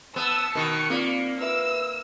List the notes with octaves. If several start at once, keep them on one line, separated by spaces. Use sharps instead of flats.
B3 A5 E6
B2 D#3 A#4 C#7
A#3 C4 F4 D5
B4 E5 E6